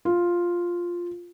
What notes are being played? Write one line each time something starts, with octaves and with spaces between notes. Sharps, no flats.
F4